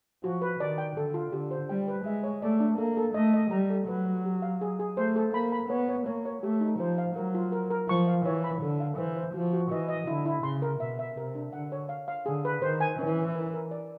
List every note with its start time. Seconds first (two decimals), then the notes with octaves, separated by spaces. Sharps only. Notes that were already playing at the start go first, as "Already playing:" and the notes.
0.23 F3 F#4
0.42 B4
0.60 D#3 D5
0.78 G5
0.96 D3 A4
1.14 F4
1.32 D3 G4
1.51 C5
1.69 G3 G5
1.88 B4
2.05 G#3 E5
2.23 C#5
2.42 A3 D5
2.60 D4
2.78 A#3 A4
2.97 A4
3.14 A3 D#5
3.34 D#5
3.51 G3 A#5
3.70 A4
3.88 F#3 B4
4.06 B4
4.25 G4
4.42 F5
4.61 G#4
4.79 G#4
4.97 A3 C5
5.16 A4
5.34 A#3 B5
5.52 B5
5.70 B3 C#5
5.89 C#5
6.06 A#3 C#5
6.25 C#5
6.43 A3 G4
6.61 D#4
6.79 F3 C5
6.98 F5
7.16 F#3 A#4
7.34 F4
7.52 A#4
7.70 A#4
7.88 F3 C#6
8.08 F5
8.25 E3 C#5
8.44 B5
8.62 D3 A4
8.80 F5
8.98 E3 C5
9.17 C5
9.34 F3 F#4
9.53 F#4
9.71 E3 D#5
9.89 D#5
10.07 D3 E4
10.25 E4
10.43 C#3 C6
10.62 A#4
10.80 B2 E5
10.99 E5
11.16 C3 A#4
11.35 D4
11.53 D3 F#5
11.72 C#5
11.89 F5
12.08 F5
12.26 D3 G#4
12.45 B4
12.62 D#3 C5
12.81 G#5
12.99 E3 C#4
13.17 C#4
13.35 A#4
13.54 A#4
13.71 D5